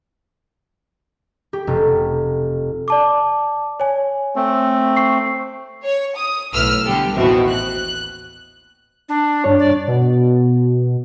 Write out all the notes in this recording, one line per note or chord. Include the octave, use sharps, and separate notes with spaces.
G4
F1
D5 A5 D6
C#5 G#5
A3 C4
C#6 C7
C#5
D#6
B1 A2 B4 E6 F6
D3 G3 B3 G4 A4
A1 D#2 B2 E3 C4 E5
F#6
D4
G2 D4 C#5
D5
B2